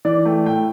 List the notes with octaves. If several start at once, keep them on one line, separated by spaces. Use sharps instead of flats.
E3 D5
A3 G5
A2 G5